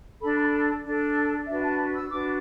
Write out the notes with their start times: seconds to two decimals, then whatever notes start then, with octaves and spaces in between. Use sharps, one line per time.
0.21 D4 A4 B5
0.42 B5
0.84 D4 A4
1.47 D4 F#4 B4 E5
1.63 A5
1.94 E6
2.11 D4 F#4 B4 D6